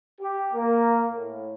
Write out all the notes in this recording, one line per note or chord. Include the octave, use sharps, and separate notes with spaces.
G4
A#3
A2